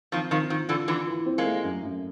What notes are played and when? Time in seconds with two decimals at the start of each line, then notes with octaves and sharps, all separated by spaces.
0.12 D#3 F3 C4
0.31 D#3 F3 C4
0.50 D#3 F4
0.69 D3 E3 F4
0.88 D3 E3 F4
1.07 E3
1.26 C4
1.38 G#3 A#3
1.45 A3
1.64 F#2
1.83 F#2